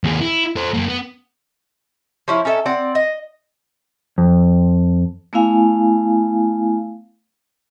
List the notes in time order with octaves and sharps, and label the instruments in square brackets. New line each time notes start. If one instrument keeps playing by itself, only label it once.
[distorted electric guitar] D#2 G#4
E4
A4 C5
F#2 A#3
B3
[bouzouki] F3 C#4 E4
C#4 D#4 A4 E5
C4 D5 F#5
D#5
[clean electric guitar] F2
[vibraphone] A3 B3 E4 F5 G#5